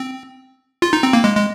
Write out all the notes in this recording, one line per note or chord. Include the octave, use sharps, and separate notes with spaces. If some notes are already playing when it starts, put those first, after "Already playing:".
Already playing: C4
F4
D#4
C4
A#3
G#3
G#3